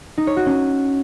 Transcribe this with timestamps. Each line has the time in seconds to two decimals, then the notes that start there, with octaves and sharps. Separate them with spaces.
0.18 D#4
0.27 C#5
0.37 F#4
0.46 C#4